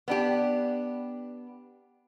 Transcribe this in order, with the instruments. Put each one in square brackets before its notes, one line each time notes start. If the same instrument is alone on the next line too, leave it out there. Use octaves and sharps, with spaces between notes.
[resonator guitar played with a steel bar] B3 D4 G4